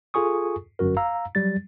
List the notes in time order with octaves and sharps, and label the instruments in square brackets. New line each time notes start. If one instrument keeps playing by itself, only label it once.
[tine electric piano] F4 G#4 A4 G#5 C#6 D#6
G1 F#2 F#4 A#4
F5 A#5 E6
F#3 G3 A6